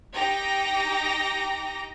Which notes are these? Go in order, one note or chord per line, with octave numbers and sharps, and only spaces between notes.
D#4 G4 G5 A#5 A#6